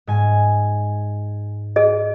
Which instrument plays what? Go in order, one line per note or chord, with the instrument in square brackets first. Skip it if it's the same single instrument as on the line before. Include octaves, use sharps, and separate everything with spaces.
[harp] G#2 G#5
[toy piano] G#4 D#5